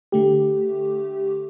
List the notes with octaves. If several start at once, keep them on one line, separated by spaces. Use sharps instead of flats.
D3 A3 G4